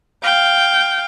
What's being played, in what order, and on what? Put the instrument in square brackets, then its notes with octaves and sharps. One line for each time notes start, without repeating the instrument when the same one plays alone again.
[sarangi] F5 [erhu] G5